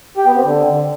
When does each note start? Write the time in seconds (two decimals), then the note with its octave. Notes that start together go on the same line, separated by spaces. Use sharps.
0.17 G4
0.26 B3
0.35 C4
0.44 D3